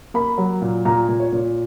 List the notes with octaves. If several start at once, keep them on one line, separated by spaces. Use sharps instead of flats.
A#3 B5
F#3
A#2
A#2 A#5
A#2
C#5
A#2